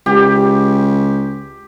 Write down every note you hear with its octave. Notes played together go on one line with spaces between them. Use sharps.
C#2 G4